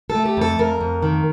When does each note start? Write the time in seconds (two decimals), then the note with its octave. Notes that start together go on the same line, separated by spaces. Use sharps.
0.10 A4
0.15 A3
0.26 G4
0.37 F2 A4
0.59 F2 A#4
0.81 F2
1.02 D#3